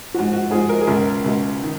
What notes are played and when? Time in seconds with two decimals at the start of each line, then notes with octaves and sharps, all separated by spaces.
0.14 G#2 F3 F#4
0.33 F#4
0.50 G#2 F3 G#4
0.69 A#4
0.81 G#4
0.87 C#2 B2 A#4
1.24 C#2 B2
1.63 D#3